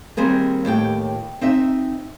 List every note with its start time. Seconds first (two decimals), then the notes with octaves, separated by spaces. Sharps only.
0.17 D#2 G3 C4 G#4 A#4
0.65 D#2 A2 G4 G5
1.41 C4 D#4 E5